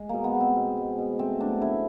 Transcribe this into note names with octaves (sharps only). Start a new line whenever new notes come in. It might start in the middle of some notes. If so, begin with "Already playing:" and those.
Already playing: G#3
B2 A#3
B3
G#3
C4
B2
G#3
B2
A3 C4
F#3 D4
C#3 E4